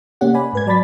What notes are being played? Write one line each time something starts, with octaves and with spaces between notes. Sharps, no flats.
C3 A#3 C#4 G4 F#5
D5 G#5 B5
G#2 B4 G#6
F#3 D5 A5 B5 A6 B6